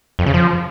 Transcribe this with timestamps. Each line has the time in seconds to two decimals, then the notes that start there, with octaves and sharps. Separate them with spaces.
0.19 F2
0.26 C#3
0.34 F3